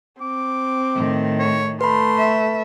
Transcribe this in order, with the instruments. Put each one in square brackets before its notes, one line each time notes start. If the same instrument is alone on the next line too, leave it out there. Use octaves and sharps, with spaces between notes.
[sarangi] C4 [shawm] D6
[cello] A2 D#3
[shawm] C#5
[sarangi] A3 [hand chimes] B4 B5 [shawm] C6
[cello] E5